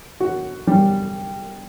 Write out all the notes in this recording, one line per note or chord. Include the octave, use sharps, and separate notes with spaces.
F#4
G3